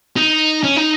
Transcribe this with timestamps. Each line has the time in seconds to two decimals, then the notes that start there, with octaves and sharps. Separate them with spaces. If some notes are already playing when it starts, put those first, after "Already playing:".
0.16 D#4
0.63 C#4
0.76 D#4